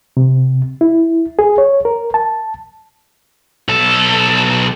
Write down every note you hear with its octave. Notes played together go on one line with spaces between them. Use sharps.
C3
E4
G#4
C#5
A#4
A5
B1 A4